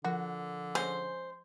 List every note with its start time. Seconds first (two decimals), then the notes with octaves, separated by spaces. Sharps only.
0.05 D3 F3 F#4 A#4
0.75 G#3 C#4 C5